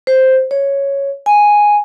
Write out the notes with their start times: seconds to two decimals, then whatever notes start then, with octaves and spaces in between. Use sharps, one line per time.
0.07 C5
0.51 C#5
1.26 G#5